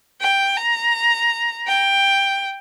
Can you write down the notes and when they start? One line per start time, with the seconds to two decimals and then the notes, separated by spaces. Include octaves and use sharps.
0.21 G5
0.57 A#5
1.67 G5